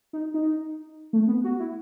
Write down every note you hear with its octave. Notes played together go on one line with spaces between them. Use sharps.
D#4
D#4
A3
B3
F#4
E4